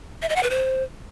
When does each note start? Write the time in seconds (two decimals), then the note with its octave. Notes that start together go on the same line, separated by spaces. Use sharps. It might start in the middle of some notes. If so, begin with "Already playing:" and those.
0.22 E5
0.29 D#5
0.36 F#5
0.43 B4
0.50 C5